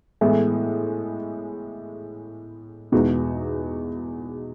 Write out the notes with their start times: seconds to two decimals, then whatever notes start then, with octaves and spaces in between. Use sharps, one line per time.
0.21 A2 E3 G#3 B3
2.92 E2 B2 G#3 D#4 F#4